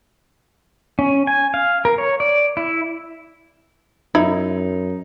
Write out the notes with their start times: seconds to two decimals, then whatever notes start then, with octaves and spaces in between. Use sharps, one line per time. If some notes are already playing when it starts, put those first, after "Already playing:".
0.99 C#4
1.27 G#5
1.54 F5
1.85 A#4
1.98 C#5
2.20 D5
2.57 E4
4.15 F#2 D#4 E4